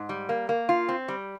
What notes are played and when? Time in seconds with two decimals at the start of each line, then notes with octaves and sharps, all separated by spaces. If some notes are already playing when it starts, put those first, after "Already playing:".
Already playing: G#2
0.09 G3
0.29 A#3
0.49 A#3
0.69 F4
0.89 C4
1.08 G3